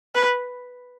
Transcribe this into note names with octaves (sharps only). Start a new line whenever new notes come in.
B4